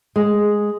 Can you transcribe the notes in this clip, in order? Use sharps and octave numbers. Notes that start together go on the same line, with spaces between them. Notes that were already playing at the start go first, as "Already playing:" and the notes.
G#3